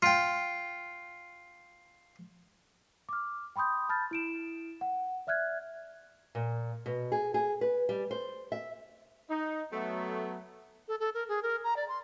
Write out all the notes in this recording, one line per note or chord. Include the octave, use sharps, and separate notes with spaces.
F4 G5
D6 F6
G5 B5 C6 D#6 G6
A5 B5 F6 G6 A6
E4 D7 E7
F#5
D5 E5 F6 F#6 G#6
A#2
B2
G#4
G#4
B4
G3
C5
E5
D#4
F#3 A3 B3
A4
A4
A#4
G#4
A#4
A#5
D5
C6